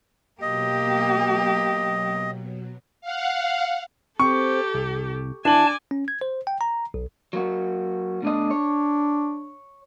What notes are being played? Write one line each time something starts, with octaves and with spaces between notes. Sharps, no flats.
B2 F#3 A#3 G4 D#5
F5 F#5
C4 G4 A4 C#6
C2
E3 D4 G#5 A5 D6 F#7
C#4
G#6
C5
G5
A#5
B1
F#3 A#3 F#4
B2 A3 D4 D#5
C#5